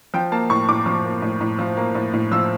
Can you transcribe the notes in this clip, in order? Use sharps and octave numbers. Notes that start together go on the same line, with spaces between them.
F3 G5
A#3 A5
A2 C#6
A2 D6
F3
A#3
A2
A2
F3
A#3
A2
A2
F3 E6